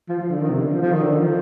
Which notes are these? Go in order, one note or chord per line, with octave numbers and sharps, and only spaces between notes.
F3
F3
D3
D#3
C3
D3
F3
F3
D#3
D3
D#3
F3